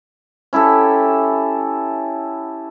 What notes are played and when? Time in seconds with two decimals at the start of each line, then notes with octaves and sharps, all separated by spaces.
0.53 C#4 E4 G4 A4